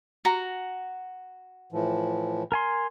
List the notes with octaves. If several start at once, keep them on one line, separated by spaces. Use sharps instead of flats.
F#4 A#5
A2 E3 F3
A#4 G#5 C6